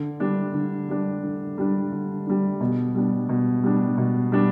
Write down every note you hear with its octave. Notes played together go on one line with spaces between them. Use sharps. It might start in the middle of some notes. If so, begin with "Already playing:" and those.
Already playing: D3
G3 D4
D3
G3 D4
D3
G3 D4
D3
G3 D4
B2
G3 D4
B2
G3 D4
B2
G3 D4